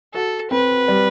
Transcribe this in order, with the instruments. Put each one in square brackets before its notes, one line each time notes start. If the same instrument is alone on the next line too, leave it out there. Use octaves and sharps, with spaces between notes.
[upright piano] F#4 [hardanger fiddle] A4
[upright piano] C4 [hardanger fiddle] B4
[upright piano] G3